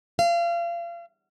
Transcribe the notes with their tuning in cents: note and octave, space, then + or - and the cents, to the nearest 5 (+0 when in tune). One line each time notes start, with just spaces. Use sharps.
F5 -35